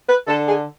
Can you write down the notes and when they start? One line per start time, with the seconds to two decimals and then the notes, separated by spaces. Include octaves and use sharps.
0.09 B4
0.27 D3 A4
0.47 G#4